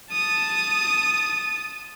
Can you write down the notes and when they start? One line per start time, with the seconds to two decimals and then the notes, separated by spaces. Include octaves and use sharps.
0.12 A5 D#6